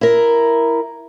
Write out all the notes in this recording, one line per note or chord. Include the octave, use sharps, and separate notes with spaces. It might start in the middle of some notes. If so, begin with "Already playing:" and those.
E4 A#4